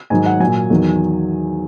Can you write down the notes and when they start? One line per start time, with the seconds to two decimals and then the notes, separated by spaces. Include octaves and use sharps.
0.10 G#2 D#3 F#3 G#5
0.25 F#5
0.40 A#2 F#3 G#5
0.70 E2 D#3 F#3